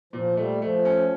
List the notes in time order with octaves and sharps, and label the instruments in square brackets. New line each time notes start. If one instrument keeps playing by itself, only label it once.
[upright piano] A#2 [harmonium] F3
[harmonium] G3 [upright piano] A3
[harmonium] F3 [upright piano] A3
[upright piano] C#4